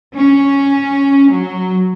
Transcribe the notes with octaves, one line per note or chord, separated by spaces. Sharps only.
C#4
F#3